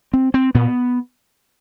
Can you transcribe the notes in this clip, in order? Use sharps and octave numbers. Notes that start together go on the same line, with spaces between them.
C4
C4
A#2 B3